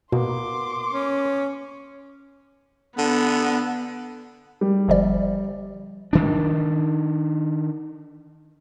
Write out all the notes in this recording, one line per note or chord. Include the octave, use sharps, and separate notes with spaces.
B2 A#3 B3 C6 D6
C#4
D3 B3
G3
G1 F3 D5
D#3 D4